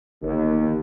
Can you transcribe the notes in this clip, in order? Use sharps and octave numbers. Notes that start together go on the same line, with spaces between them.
G1 D#2